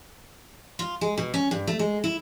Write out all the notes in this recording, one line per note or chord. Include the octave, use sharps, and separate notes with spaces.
F4
G#3
B2
C#4
G2
A3
G#3
E4